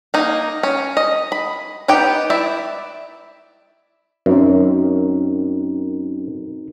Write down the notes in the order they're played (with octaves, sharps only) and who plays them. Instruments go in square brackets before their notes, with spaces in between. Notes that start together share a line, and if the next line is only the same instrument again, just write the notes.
[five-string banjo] A#3 D#4
C#4
D#5
B5
B3 D#4 G4 G5
E4 D5 E5
[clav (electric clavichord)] F#2 [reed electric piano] C4 D#4 A#4